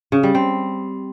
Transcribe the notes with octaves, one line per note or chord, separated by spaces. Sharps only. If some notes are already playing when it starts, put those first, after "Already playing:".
C#3
G3
C4